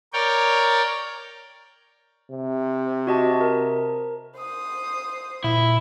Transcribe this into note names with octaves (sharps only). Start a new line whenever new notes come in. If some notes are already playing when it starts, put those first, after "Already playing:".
A#4 C#5 D5 G5
C3
F#4 D#5 A5
A#4
C5 D#6
A#2 E4